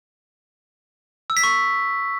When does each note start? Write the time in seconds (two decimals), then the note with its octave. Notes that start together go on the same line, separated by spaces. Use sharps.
1.30 E6
1.37 B6
1.43 C#6